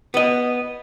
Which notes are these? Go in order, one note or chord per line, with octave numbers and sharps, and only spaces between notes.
B3 D#5